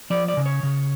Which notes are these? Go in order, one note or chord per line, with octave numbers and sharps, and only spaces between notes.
F3 D5
D5
C#3
C#5
C#3